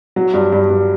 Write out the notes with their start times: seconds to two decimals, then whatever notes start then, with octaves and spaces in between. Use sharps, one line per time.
0.16 F#3
0.34 G2
0.52 G2
0.70 G2